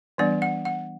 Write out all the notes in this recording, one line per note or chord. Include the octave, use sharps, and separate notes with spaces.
E3 G3 B3 D4 D5
F#5
F#5